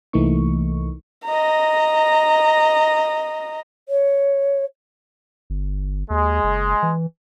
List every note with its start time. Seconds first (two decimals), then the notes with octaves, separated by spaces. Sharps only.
0.13 C2 E3 A3 A#3 D#4 C#6
1.25 D#5 A#5
3.89 C#5
5.50 G1
6.10 D#2 G#3
6.44 F#1
6.83 E3